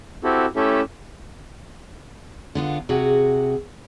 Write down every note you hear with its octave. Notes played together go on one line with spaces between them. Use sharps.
C4 E4 F#4 G4 A4
A3 C#4 E4 G4 A4 E5
D3 B3 F4
C3 F#4 G#4 F#5